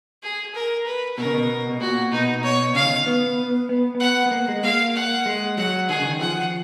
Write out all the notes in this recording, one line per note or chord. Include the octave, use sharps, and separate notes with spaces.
G#4
A#4
B4
B2 A#4
C#3
B2
B2
A#2 F#4
B2 D#4
C#5
C#3 F5
D#3
B3
B3
B3
F#5
B3
A#3
G#3
A#3 F5
F#5
G#3
F#3 F#5
D#3 G#4
C#3
D#3
F3 F#5